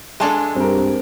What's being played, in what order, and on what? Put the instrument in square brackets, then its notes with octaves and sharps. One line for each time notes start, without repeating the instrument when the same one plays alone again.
[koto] G#3 D4 A4 [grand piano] G#5 A5 C6
[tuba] G2 [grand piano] C4 A#4